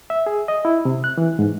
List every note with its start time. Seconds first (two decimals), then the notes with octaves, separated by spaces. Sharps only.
0.10 E5
0.26 G#4
0.48 D#5
0.65 E4
0.85 C3
1.04 F#6
1.18 E3
1.39 G#2